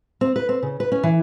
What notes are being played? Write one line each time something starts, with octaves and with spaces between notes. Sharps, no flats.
C4
B4
C4
C#3
B4
C#4
E3